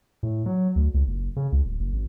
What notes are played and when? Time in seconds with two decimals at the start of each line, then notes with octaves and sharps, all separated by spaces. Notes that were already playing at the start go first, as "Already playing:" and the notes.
0.23 A2
0.46 F#3
0.76 D2
0.94 C#2
1.07 F#1
1.36 C#3
1.52 C#2
1.65 D1
1.79 F#1
1.92 G#1